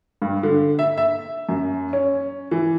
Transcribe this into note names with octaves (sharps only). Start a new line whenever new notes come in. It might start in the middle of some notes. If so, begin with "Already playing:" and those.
G2
D3
E5
E5
F#2
C#4
E3